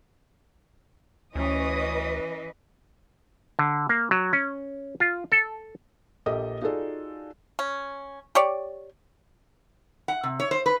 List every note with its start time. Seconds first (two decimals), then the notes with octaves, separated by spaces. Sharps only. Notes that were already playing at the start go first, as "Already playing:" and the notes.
1.35 D2 E3 C#4 B4 D#5 D#6
3.59 D3
3.89 A#3
4.11 F#3
4.33 C#4
5.00 F4
5.32 A4
6.26 A#1 A#3 G4 A4 D#5 D#6
6.61 D#4 F4 F#4 G#4 A4 D5
7.59 C#4
8.35 G4 C#5 D5
10.08 F#5
10.23 C3
10.40 C#5
10.51 C5
10.66 B4